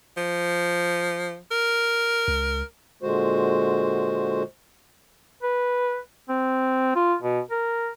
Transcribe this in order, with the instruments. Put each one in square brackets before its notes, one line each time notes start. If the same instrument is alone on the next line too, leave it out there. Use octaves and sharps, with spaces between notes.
[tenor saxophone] F3
A#4
[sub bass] C#2
[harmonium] A#2 D3 G#3 F#4 C5
[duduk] B4
C4
F4
B2
A#4